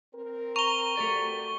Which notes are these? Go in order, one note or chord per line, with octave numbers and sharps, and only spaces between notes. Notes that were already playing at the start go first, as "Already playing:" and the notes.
C4 A#4
A#5 C#6 G7
A3 F#4 G4 A4 D5